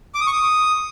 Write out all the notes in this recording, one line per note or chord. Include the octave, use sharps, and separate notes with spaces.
D6
D#6
C#6
D#6